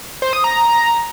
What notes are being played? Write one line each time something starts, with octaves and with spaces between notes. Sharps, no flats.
C5
D#6
A#5